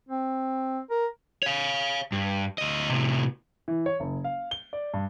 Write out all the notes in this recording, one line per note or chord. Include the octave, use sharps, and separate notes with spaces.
C4
A#4
C#5 F5
G2
D2 D#5
A2 C3
E3
C#5
F#1
F5
G7
D5
G2